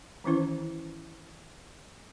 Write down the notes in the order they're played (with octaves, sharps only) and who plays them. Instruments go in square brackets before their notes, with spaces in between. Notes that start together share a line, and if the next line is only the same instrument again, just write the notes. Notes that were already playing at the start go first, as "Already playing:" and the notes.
[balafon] D#3 E3 C#4 E4 C5